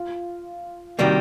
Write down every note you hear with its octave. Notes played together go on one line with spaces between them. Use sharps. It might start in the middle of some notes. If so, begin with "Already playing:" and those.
Already playing: F4
C3 D#3 G3 A#3 F#4